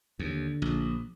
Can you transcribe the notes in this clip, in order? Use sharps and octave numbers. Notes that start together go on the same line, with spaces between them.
D#2 D3
A#1